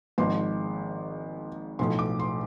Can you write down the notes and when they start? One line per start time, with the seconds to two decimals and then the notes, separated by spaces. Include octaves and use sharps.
0.18 G#1 G#2 F3 C6
1.79 B1 A2 F3 C6
1.99 D6
2.19 C6